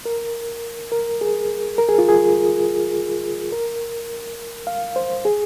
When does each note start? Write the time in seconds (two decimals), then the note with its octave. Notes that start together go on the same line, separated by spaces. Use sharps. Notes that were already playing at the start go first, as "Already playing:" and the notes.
0.05 A#4
0.92 A#4
1.21 G#4
1.78 A#4
1.89 G#4
1.98 F4
2.09 G#4
3.52 A#4
4.67 F5
4.96 C5
5.25 G#4